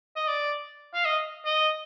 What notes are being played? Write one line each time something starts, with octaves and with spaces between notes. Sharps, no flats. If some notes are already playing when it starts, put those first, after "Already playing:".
D#5
D5
F5
D#5
D#5